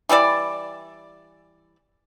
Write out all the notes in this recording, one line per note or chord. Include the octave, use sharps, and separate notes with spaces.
E3 G3 E4 D5